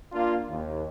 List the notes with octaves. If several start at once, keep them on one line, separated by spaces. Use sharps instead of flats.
A#3 D4 F4
D#2